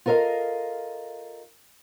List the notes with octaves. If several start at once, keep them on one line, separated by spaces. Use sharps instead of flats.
F4 A4 A#4 D#5 F5